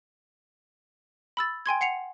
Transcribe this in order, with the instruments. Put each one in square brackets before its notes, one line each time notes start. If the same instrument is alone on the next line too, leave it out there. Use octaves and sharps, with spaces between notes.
[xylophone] B5 E6 A6
G5 G#5 C6 G#6
F#5 C7 C#7 F7